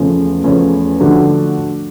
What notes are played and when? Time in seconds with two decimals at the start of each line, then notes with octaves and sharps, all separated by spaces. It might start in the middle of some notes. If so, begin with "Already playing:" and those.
Already playing: E2 C#3 F3 A3 C#4
0.44 E2 C#3 F3 A3 C#4
1.00 D3 F3 A3 D4 F#4